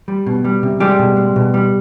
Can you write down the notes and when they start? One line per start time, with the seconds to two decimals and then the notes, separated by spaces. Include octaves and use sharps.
0.08 G3
0.26 B2
0.44 G3
0.63 C3
0.80 G3 G#3 G4
0.99 B2
1.17 G#3
1.36 B2
1.54 G3